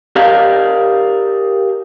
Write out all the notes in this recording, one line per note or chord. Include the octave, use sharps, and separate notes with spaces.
G4 A#4 D5 F5